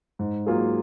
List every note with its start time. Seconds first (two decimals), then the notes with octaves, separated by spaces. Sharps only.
0.19 G#2
0.46 F#3 A#3 F4 G#4